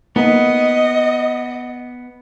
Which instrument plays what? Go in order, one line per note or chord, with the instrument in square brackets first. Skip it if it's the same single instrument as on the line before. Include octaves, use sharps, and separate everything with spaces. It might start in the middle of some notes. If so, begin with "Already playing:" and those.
[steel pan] A#3 D#4 [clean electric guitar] B3 [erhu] D#5